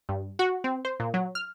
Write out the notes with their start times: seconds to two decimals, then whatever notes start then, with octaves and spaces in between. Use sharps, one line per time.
0.09 G2
0.39 F#4
0.64 C4
0.85 C5
1.00 A#2
1.14 F#3
1.35 F6